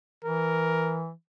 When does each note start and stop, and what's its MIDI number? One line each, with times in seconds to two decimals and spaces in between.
0.25 1.11 52
0.25 1.01 70